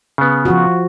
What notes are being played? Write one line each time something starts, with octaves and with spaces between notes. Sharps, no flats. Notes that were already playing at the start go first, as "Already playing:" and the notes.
C#3 B3
F3 F4 F#4